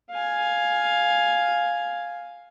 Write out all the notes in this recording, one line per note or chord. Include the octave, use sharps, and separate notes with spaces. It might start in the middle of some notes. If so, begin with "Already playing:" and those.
F5 G#5